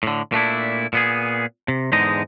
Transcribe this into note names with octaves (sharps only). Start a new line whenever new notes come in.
A2 D3
A#2 A3 D4 E4
A#2 B3 G#4
C3
E2 G#2 D3 G#3 D#4 D#5